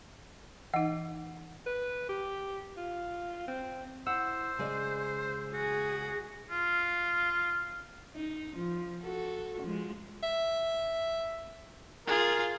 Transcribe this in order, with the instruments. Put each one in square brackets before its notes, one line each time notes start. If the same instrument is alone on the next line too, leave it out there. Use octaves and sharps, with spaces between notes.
[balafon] E3 D#4 [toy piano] F#5
[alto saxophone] B4
G4
F4
C4
[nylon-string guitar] E4 F#5 [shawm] C5 [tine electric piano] E6
[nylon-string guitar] C#3 G#3 D5
[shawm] F#4 [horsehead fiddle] G#4
[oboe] F4
[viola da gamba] D#4
F3
F#4 A4
F3 G#3
[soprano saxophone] E5
[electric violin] F4 G#4 [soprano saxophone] A#4